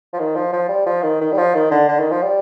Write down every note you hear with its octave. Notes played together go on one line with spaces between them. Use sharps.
F3
D#3
F3
F3
G3
F3
D#3
D#3
G3
F3
D#3
D3
D3
D#3
F3
G3